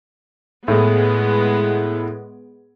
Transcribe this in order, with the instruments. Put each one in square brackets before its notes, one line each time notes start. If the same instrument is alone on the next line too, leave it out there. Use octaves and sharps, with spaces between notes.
[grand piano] A2 [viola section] G#3 B3